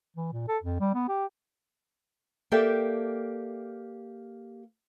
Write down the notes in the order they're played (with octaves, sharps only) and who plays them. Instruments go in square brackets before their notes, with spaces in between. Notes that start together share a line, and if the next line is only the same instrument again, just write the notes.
[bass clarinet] E3
A#2
A4
F2
G3
B3
G4
[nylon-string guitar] A#3 G4 A4 D5 E5 G5